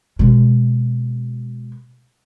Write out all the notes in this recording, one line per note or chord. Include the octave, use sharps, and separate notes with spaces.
B2 G#3